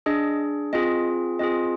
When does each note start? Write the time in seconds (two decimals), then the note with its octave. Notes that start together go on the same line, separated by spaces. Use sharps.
0.06 D4 G#4 D#5
0.73 C4 F4 G#4 D#5
1.39 C4 F4 G#4 D#5